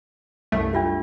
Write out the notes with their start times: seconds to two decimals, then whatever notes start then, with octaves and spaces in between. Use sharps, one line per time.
0.52 C2 F#2 A3
0.73 D4 F4 G4